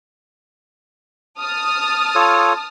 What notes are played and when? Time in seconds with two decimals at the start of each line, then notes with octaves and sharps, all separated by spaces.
1.41 A5 D#6 F6
2.15 F4 A4 C#5